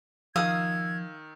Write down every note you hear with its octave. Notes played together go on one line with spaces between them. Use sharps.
D#3 F3 F5 D#6 E6 G#6